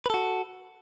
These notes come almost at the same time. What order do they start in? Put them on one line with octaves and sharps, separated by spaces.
B4 A4 F#4